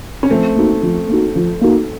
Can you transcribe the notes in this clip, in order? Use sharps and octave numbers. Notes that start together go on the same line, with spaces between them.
C#4
F3 A3 C4
A#3 D#4 F#4
F3
A#3 D#4 F#4
F3
A#3 D#4 F#4